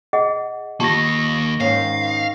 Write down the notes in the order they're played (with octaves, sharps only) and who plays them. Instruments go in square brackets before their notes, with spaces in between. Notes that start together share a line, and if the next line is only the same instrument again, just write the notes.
[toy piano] G#4 D#5 F#5
[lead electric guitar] D#3 A#3 [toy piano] F4 G4 A5 [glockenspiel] C#6 A#6
[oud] G#2 D#3 C#4 [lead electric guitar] F5 [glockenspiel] C7